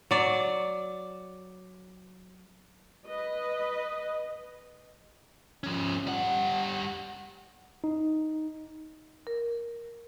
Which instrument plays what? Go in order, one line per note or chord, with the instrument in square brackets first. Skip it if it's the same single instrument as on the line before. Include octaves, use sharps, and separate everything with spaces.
[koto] F#3 D5
[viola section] B4 D#5
[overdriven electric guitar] F3 C#4
G3 F#5
[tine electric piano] D#4
[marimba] A#4